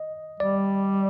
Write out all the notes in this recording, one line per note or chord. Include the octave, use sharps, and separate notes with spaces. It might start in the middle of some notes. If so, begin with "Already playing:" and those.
Already playing: D#5
G3 D5